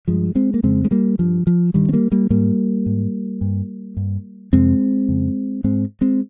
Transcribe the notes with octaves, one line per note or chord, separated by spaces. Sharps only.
G2 F3 G#3
G#3 C4
A#3
F2 C#3 G#3 C4
G#3
G3 A#3
G2 F3
F3
G2 D#3 G3
C4
G3 A#3
G3 A#3
G#2 G3 A#3
G#2
G2
G2
F2 C3 G#3 C4
F2 C#3
G#2 G#3 C4
G#3 C4